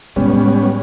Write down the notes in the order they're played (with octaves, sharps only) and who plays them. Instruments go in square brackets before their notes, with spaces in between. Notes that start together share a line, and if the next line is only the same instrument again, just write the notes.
[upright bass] A2 G#3 [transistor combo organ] G3 B3 C#4